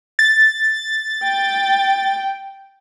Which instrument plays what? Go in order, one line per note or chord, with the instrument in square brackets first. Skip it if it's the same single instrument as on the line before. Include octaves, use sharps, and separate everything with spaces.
[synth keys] A6
[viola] G5